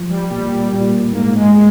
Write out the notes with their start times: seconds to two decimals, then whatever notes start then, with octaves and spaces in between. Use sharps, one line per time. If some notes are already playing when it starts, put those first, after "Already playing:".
Already playing: F3
0.10 G3
0.30 A#2 G3
0.72 A#2
1.13 G#2 A#3
1.34 G#3
1.54 G#3